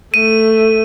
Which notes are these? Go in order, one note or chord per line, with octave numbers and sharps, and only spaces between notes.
A3 D#7